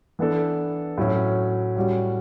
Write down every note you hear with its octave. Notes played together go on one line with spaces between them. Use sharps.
E3 B3 D4 A4
A2 F#3 C#4 F#4 C#5
A2 G3 C#4 F#4